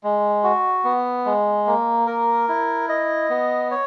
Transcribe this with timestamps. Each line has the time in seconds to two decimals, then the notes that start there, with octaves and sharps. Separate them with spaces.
0.03 G#3
0.44 F#4
0.84 B3
1.26 G#3
1.67 A#3
2.07 A#4
2.49 E4
2.89 D#5
3.30 B3
3.71 C#5